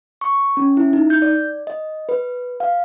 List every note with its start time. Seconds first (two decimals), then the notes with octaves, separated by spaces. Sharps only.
0.21 C#6
0.57 C#4
0.77 E4
0.93 D#4
1.10 G6
1.22 D5
1.67 D#5
2.09 B4
2.60 F5